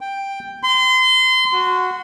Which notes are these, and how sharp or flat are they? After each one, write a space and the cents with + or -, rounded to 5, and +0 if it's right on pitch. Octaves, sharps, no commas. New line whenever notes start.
G5 +5
C6 -30
F#4 -10